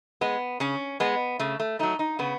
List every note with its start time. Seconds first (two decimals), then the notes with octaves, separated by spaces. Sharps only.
0.21 G#3 B3
0.60 C#3 C#4
1.00 G#3 B3
1.39 C#3 A3
1.60 A3
1.79 F#3 A3 D#4
1.99 D#4
2.19 C#3 B3